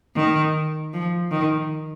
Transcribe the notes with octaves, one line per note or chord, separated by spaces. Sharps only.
D#3
F3
D#3